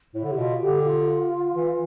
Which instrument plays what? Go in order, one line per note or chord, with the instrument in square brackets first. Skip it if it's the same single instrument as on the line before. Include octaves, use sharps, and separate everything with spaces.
[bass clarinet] A2 [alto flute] E4
[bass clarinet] D3
C3
[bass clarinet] B2 [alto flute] F4
[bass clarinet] D3 [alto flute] G4
[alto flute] F4
[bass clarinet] E3